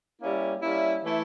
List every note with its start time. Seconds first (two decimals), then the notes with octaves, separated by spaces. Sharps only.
0.20 G3 A#3 C#4 E4
0.62 G3 A#3 C#4 E4
1.04 E3 A3 E4